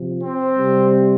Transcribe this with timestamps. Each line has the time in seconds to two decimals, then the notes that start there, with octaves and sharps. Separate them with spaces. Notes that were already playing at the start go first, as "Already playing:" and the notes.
Already playing: C3 F3
0.21 C4
0.57 C3 G3